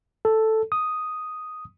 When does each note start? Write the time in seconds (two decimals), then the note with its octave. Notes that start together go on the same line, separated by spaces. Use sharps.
0.25 A4
0.72 D#6